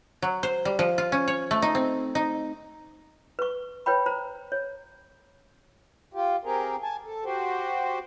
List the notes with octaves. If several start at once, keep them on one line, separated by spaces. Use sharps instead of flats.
F#3
C5
G3
F3
F4
C#4
C#5
A3
D#4
C4
D#4
B4 C#6
B4 C#5 G5 B5
C5 A#5
C#5
F4 G4
C4 G4 G#4 A#4
G#5 A5
A4
F#4 G4 C5